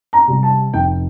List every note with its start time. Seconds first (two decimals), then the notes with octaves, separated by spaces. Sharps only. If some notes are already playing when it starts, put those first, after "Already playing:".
0.13 A#5
0.28 C3 G3
0.43 A5
0.74 F1 G5